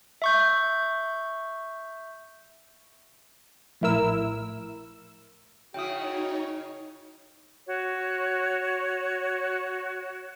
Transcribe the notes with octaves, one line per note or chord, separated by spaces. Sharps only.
E5 C#6 G6
A#1 A2 E4 A#4 E6
C#3 D#4 E4 F#4 C#5 G5 D#6
F#4 C#5